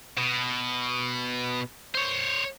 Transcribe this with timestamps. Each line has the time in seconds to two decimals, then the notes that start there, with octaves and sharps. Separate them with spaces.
0.17 B2
1.95 C5 C#5